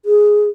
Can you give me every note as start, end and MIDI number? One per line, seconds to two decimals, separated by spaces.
0.05 0.49 68